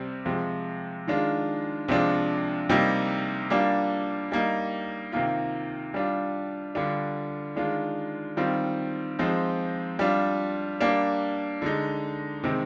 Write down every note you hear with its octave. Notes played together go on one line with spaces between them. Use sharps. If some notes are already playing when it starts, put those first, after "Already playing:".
Already playing: C3 G3 C4
C3 F3 G#3
D#3 G#3 D4 F4
C3 F3 G#3 D4 F4
C3 G3 A#3 D#4
G3 A#3 D4 F4
G3 A#3 D#4
C3 D#3 A#3 F4
G3 D4 F4
D3 G3 D4 F4
D#3 G#3 D4 F4
D#3 G3 C4 F4
F3 G#3 C4 D#4
G3 D4 F4
G3 A#3 D4
D3 G#3 D#4
C3 D#3 G#3 C4